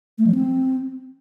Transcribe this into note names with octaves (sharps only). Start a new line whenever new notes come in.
A3
F3
C4